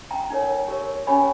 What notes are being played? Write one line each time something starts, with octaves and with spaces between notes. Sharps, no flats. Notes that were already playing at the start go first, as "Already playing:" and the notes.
G5 A#5
D#4 A#4 C#5
G4 A#4 C#5
C#4 G4 C#5 G#5 B5